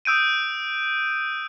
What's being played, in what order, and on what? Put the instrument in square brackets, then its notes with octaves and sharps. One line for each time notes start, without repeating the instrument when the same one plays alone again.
[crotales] D#6 E6 G6 D7 D#7